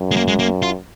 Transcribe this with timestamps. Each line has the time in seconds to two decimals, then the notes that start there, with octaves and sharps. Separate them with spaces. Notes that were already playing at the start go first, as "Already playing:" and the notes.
Already playing: F#2
0.11 G#3
0.16 A#3
0.28 G#3
0.39 A#3
0.62 F4